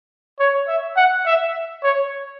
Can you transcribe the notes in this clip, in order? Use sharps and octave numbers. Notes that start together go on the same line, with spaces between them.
C#5
E5
F#5
E5
C#5